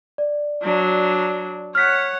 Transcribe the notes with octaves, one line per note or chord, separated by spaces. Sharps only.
D5
F#3 D4
C#5 F#5 F6 B6